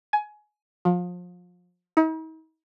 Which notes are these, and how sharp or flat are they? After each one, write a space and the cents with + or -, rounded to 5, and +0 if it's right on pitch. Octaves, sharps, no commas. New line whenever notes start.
G#5 +20
F3 +30
D#4 +45